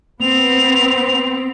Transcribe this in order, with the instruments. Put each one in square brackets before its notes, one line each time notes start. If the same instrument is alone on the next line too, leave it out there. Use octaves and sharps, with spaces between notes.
[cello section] B3 C4 [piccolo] F7